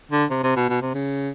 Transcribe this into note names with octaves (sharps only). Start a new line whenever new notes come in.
D3
C3
C3
B2
B2
C3
C#3